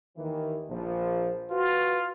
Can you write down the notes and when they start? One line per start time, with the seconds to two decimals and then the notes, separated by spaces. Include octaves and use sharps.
0.17 D#2 D#3 E3
0.69 A#1 F3
1.51 F4 F#4 B4